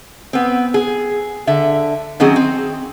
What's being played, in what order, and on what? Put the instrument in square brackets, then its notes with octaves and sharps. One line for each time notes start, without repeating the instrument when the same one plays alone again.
[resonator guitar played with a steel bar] B3 C4
G#4
D3 E5
D#3 F#3 C4 C#4 G#4
C4